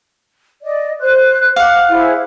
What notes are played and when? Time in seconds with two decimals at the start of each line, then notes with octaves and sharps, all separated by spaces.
0.63 D5 D#5
1.00 C5 F#6
1.56 F5 F#5 D6
1.89 E4 G#4 C5